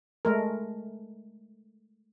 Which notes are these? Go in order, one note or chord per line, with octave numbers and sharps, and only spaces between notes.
G#3 A3 A#4